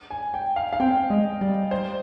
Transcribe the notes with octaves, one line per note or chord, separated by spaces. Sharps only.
G#5
G5
F5
F5
C4 G5
G#3 D#5
G3 D5
C5